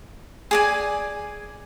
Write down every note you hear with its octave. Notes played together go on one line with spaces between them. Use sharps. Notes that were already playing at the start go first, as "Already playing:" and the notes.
G#4 D5 G#5